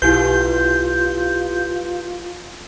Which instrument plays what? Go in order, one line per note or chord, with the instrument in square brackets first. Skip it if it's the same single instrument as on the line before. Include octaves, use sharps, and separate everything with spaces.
[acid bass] B1 [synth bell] E4 G4 B4 [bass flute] F4 [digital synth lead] G6